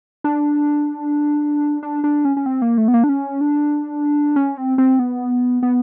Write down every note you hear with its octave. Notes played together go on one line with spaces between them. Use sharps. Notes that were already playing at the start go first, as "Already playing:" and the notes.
D4
D4
D4
C#4
C#4
C4
A#3
A3
B3
A#3
D4
C#4
D4
C#4
C4
C4
B3
B3